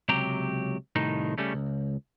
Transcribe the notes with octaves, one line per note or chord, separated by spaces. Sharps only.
C#2 C3 F#3 G4 A#5
C2 A2 D#3 D#4
C#3 G3 A3 C#4
C#2